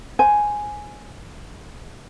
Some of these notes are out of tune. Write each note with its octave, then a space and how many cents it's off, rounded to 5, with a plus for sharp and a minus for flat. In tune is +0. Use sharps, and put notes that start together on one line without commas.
C5 +0 G#5 +0